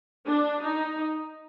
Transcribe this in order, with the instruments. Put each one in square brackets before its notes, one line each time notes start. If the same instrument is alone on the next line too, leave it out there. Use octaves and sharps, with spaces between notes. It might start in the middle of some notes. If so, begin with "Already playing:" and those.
[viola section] D4
D#4